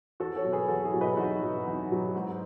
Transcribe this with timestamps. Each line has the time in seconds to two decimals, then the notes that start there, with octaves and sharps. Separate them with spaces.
0.20 E2 F#4 A4
0.36 A4 C#5
0.44 B2 F#3
0.52 G#4 B4
0.68 E2 F#4 A4
0.85 E4 G#4
0.93 B2 F#3
1.01 B4 D#5
1.17 E2 D#4 F#4
1.42 B2 F#3
1.66 E2 D#4
1.90 B2 F#3
2.15 G#2